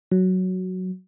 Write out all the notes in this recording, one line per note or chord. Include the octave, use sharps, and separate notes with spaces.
F#3